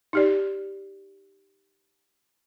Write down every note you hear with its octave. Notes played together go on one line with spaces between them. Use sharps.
D#4 G4 D5